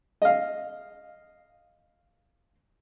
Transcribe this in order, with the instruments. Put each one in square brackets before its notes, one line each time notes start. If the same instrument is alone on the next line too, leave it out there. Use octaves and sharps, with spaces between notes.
[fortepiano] D#5 F5